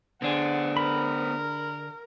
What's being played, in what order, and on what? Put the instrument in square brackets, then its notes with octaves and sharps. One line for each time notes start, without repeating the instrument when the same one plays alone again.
[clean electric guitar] D3 D4 G#4 [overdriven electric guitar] B3 C5 [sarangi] F#5
[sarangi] A#4 [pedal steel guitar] B5